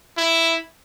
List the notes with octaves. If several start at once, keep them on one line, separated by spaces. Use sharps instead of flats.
E4